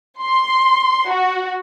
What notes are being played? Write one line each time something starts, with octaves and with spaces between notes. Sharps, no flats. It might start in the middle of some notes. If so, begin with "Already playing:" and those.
C6
F#4